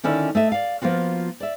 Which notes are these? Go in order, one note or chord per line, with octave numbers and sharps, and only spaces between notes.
D3 D#3 C#4 E4 D5 E5
A3 D#5 E5
D5 F5
F3 A#3 B3 F4 F#4
D5 E5